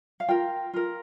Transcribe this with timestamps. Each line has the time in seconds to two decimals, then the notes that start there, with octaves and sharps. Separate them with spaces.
0.20 F5
0.28 F4 A#4 G5
0.74 F4 A#4